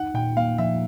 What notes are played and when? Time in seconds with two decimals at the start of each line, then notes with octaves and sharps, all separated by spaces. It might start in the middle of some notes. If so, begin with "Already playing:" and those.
Already playing: D#4 F#5
0.14 A#2 G5
0.36 A#3 F5
0.58 F3 E5